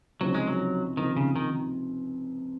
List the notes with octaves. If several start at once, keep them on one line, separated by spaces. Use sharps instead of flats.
C#2 C3 F3 F#3 C4 D#4
G#3
F#3
C#2 C3 D#3 F3 C4 D#4
C#3
D#3